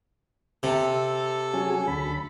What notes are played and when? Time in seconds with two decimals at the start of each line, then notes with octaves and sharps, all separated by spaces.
0.63 C3 A4
1.54 F#3 C#4 G#4
1.88 D2 B5